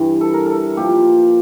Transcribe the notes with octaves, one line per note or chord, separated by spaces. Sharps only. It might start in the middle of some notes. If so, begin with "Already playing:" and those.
Already playing: G2 E3 G3
A4
A#4
A4
A#2 F3 G4